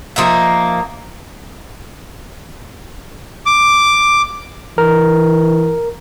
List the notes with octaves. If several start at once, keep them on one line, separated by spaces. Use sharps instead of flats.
F3 A#3 D#4 E5
D6
E3 A#4